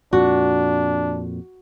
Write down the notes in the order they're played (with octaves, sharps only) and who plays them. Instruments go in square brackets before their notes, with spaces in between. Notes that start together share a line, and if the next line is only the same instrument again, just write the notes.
[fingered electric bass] F2 A#2 [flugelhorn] D4 [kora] F#4